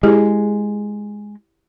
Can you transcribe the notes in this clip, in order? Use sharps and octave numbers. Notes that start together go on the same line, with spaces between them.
G#3 E4 G4 G#4